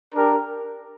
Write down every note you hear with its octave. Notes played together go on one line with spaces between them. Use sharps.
D4 G4 A#4